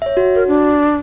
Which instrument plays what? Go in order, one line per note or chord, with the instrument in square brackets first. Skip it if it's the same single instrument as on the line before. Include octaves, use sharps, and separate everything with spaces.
[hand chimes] C#5 E5
F#4
[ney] A#4
D4